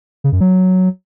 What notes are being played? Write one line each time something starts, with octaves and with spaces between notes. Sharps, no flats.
C#3
F#2
F#3